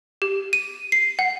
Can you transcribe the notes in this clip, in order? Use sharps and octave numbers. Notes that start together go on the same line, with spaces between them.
G4
D#7
C7
F#5